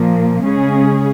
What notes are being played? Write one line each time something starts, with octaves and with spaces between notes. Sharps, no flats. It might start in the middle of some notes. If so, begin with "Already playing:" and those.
Already playing: A#2 F3 A#3
C#3 G#3 C#4 G#4